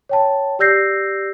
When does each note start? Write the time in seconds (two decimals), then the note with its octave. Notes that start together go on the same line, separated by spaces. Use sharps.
0.09 C#5 G5 A5
0.59 G4 D5 E6 G6 A#6 C7